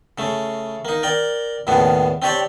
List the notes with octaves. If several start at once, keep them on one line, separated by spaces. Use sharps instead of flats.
C#3 A3
A#3 D#4
A#4 D5 G5
D#2 A2 C#3 B3 D4
C4 D4 G4 C#5 D5 G5